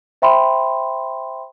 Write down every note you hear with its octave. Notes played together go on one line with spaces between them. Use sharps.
C5 E5 G5 B5 C6